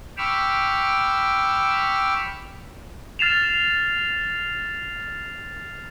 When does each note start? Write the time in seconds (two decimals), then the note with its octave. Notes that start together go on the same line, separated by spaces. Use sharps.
0.17 G5 B5 C#6 D6 E6 F6
3.19 F6 A6 C7 E7 F7